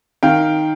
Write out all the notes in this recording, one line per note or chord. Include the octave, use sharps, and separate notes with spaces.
D#3 F5 G5